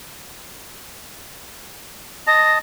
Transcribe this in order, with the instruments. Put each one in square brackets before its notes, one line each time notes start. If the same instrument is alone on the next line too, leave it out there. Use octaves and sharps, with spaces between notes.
[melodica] D#5 A5 [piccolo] A#6